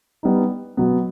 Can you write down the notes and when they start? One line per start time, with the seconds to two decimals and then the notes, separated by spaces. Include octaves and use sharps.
0.23 G3 B3 D#4
0.77 B2 F#3 B3